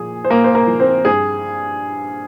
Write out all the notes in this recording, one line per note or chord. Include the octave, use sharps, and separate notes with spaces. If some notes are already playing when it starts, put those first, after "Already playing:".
Already playing: A#2 F3 G#4
C5
A#2 A#3 A#4
C5
A#3 A#4
F3
C4 C5
G2 G#4